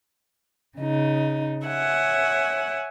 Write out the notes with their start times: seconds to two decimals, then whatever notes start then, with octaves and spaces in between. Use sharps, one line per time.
0.77 C#3 D#4
1.67 C#5 E5 F#5 G#5